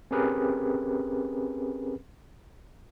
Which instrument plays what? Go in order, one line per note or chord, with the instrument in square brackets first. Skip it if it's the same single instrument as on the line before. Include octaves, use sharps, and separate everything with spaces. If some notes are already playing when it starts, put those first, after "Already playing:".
[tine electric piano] C4 C#4 G4 G#4 A#4 B4